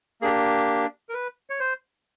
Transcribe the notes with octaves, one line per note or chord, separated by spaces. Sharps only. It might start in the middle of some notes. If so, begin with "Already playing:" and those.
A#3 D4 G4 G#4
A#4
B4
C#5
C5